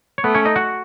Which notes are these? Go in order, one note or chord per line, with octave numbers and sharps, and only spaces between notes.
C#5
A3 B3 B4
C#4 C#5
D#4 D#5
F#4 F#5